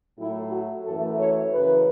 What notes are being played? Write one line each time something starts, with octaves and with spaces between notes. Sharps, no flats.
A2 F#3 A3 E4
F#4
F#2 E3 A3 A4
C#5
F#2 C#3 E3 B4